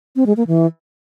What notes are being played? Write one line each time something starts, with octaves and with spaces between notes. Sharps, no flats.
C4
G#3
A#3
E3